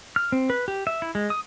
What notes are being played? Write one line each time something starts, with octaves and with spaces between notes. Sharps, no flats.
F6
C4
B4
G4
E5
E4
G#3
D#6